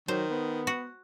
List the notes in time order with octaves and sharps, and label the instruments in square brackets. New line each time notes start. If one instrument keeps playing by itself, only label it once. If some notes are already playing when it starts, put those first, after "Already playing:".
[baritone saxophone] D#3 [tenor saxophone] F#3 [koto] C5
[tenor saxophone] B3
[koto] F#4